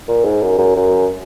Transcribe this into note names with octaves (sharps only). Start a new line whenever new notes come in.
A#2
G#2
F#2
F#2
F#2